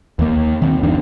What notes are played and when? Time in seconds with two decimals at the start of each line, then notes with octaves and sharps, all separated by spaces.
0.19 D#2 A#3
0.62 D#3 C4
0.83 G1 E2 D#3 D4